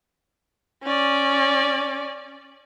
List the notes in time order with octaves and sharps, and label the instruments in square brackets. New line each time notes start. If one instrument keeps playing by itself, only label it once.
[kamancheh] C#4 D5